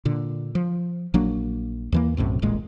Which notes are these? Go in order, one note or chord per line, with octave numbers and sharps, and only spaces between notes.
A#2 D3
F3
A#1 F#3 A#3 D4
D#2 E3 A#3
B1 F#2 A2 C3
D#1 A1 A#2 G#3